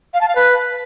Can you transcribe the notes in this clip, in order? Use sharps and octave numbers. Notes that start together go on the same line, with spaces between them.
F5
A5
F5
B4